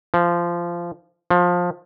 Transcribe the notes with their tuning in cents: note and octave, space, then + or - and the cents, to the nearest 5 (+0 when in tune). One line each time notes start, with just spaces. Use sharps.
F3 -15
F3 +20